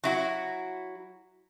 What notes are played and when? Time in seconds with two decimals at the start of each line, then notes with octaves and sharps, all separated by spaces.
0.04 F#3 E4 F#4